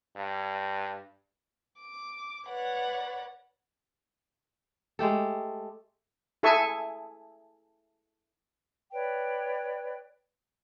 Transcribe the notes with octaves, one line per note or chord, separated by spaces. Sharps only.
G2
D6
B4 C#5 D5 F#5
G#3 A3 G4 A4
E4 G#4 A4 E5 G#5 C#6
B4 C#5 D5 G5